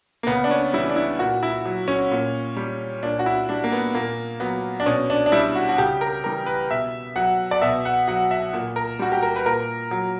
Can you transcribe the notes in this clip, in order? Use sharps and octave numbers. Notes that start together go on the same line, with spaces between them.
A#3
C#3 B3
D4
C#4
E3 G3 E4
D4
E4
A#2 F#4
E4
F#3
C#4
A#2
G3
A#2 D4
F#4
E4
G3 D4
A#3
B3
A#2 A#3
F#3 B3
D4
B2 C#4
D4
D4
G3 E4
F#4
F#4
C#3 G4
A#4
E3 G3 A#4
B4
B2 E5
F#3 F#5
D5
B2 E5
F#5
F#3 F#5
E5
A#2
A#4
G3 F#4
G4
A#4
B4
A#2 A#4
F#3